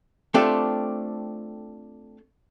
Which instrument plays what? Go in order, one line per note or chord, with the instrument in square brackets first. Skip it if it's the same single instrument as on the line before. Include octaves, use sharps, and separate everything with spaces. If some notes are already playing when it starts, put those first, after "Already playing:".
[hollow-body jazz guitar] A3 C4 D4 F4 G4 A4